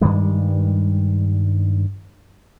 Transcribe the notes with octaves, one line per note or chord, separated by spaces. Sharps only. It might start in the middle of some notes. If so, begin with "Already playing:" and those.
G2 D#3 G3 G#3